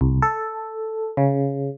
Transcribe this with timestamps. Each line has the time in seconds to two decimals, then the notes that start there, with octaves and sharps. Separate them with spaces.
0.01 C2
0.22 A4
1.17 C#3